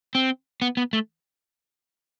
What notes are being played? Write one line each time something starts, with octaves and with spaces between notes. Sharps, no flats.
C4
B3
B3
A3